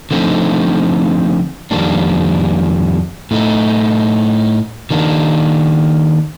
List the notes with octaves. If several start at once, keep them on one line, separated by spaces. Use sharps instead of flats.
D3 F3 A3 C4 D#4
F2 D#3 G3 A#3 D4
A2 A3 D#4
D#3 A#3 D4